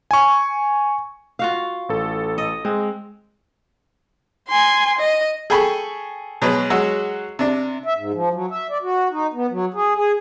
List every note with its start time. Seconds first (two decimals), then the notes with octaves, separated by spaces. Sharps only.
0.11 G#5 C#6
1.39 F4 F#4 F5
1.89 A1 A4
2.38 D#5
2.65 G#3 C4
4.48 G#5 C6
4.99 D#5
5.50 G#4 A4 G5 G#5 B5 C#6
6.42 B2 F#3 G#3 G#4 B4
6.70 F#3 G#3 F#4 E6
7.39 C3 D4
7.84 E5
7.97 G#2
8.14 F3
8.33 F#3
8.51 E5
8.70 D5
8.82 F#4
9.11 D#4
9.34 B3
9.51 F#3
9.74 G#4
9.95 G#4